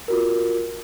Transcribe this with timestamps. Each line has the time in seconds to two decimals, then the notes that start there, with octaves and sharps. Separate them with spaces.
0.08 F4 F#4 A#4